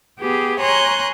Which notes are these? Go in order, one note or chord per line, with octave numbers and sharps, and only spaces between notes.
B3 G4 G#4
C#5 G#5 A#5 C6 F#6 G6